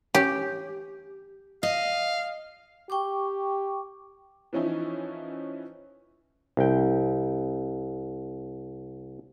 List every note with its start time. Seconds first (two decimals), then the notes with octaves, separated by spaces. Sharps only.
0.15 C#4 G4
1.63 D#5 F5
2.90 G4 G5 C#6 D6
4.53 E3 F3 C#4 D#4 E4
6.57 C2 G5